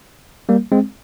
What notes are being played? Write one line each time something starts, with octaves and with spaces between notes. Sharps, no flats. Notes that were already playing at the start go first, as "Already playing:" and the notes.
G3 A#3
G#3 C4